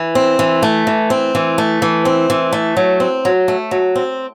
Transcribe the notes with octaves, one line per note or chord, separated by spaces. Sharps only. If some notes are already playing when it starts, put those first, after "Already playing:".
Already playing: E3
C4
E3
A3
E3
C4
E3
A3
E3
C4
E3
A3
F#3
C4
F#3
A3
F#3
C4